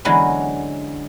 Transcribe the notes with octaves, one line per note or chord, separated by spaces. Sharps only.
D3 E3 F#3 G#3 B3 C#4